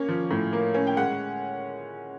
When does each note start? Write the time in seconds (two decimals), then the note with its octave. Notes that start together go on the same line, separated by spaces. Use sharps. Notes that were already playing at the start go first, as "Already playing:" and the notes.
Already playing: A#3 C#4
0.09 F3
0.31 A2
0.53 A#3
0.74 C#4
0.87 G5
0.97 G#3 F#5